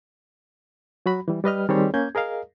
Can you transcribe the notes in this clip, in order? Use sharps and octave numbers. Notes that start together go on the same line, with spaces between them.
F#3 F#4 B5
E3 G3
G3 B4 D#5 F6
D#3 G3 C4 G4 G#4 C#5
A#3 C#4 G6 G#6
G#4 A#4 D#5 F5